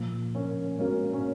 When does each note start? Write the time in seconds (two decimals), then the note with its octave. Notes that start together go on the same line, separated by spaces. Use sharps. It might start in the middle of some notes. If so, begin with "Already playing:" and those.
Already playing: A#2 F3 A#3
0.35 A#3 C#4
0.79 G#3 A#3 B3 C#4 F#4 A#4
1.13 C#4